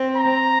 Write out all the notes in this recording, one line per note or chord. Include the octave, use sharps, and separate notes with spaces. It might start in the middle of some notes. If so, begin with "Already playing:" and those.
Already playing: C4
A#5